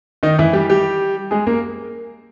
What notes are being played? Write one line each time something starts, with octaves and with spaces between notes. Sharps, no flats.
D#3 D#4
E3 E4
G3 G4
G3 G4
G#3 G#4
A#3 A#4